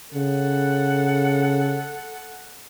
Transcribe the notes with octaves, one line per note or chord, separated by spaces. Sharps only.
C#3 A4 F#5